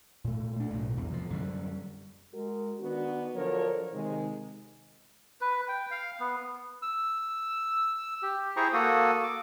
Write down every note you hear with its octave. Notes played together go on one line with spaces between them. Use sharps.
A#2 A3
A3 D4
B1 A2
E2 C3 G3
C3 F3
F#2 D3 G3
G#3 F#4 A#4
D#3 B3 D4 F#4
D3 F3 F#3 A4 A#4 C#5
C3 D#3 G#3
B4
G5
F5
B3
E6
G4
E4 G#4 C5 G5 A#5 C#6
A#3 F#4 A4 D#6
D6